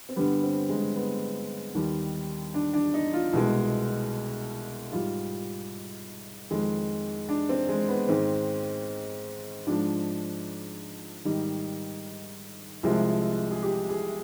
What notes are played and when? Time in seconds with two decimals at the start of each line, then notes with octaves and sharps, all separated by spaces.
0.09 C4
0.16 G2 D3 G3 B3
0.43 C4
0.69 G#3
0.96 B3
1.75 D#2 D#3 G3
2.54 D4
2.74 D4
2.94 D#4
3.13 F4
3.33 C2 B2 G#3
4.91 G#2 G3 F4
6.50 F2 D#3 G#3
7.29 D4
7.49 C4
7.69 G#3
7.88 B3
8.08 G#2 D#3 G#3 C4
9.67 G#2 F3 G#3 D4
11.25 G#2 D#3 G3 D#4
12.83 C2 C3 F3 G#3
13.51 G#4
13.63 G4
13.89 G#4